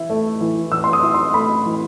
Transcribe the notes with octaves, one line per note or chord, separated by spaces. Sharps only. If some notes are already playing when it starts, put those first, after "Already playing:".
Already playing: E3 E4
A3
E3
E3 E6
C6
D#6
E4
C6
A3 B5
E3